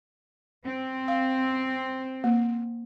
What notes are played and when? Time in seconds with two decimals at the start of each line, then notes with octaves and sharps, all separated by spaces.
0.65 C4
1.08 F5
2.24 A#3